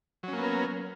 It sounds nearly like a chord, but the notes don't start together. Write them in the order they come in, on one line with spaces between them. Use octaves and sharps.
F#3 C#4 A#3 B3 A#4